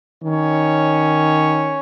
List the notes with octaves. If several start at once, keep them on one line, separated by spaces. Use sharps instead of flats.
D#3 C#4 C#5